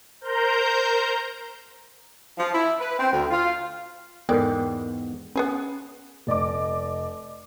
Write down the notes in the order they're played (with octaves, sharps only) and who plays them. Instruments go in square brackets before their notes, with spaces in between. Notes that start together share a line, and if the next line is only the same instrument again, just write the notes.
[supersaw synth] A#4 C5 A#5 G6
[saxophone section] F3
E4
B4
C4
D2
F4
[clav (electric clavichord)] E2 G#2 [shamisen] G#3 D5 [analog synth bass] B3 [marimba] A4 A#4 G5
[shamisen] B3 G#4 B4 [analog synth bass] C#4
[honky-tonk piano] F1 D5 D#5 D6